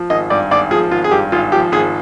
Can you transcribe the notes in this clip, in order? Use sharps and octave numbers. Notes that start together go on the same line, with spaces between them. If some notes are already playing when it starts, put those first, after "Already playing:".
Already playing: F3
G#1 D#5
G2 D5
G#1 D5
F3 G#4
G#1 F4
G#4
G2 G4
G#1 F4
F3 G4
G#1 G#4